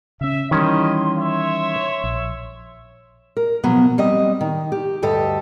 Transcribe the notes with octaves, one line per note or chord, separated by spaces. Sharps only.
C#3 C#4 E5
D#3 E3 G3 A#3 C#4 E4 D#5 C6
C#5 E5 C6
A#1
A#4
B2 F3 F#3 B3
G3 C4 D#5
D#3
G4
D2 G2 G4 A4 D#5